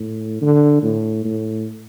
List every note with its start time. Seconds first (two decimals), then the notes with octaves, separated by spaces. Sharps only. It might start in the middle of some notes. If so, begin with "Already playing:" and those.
Already playing: A2
0.42 D3
0.83 A2
1.25 A2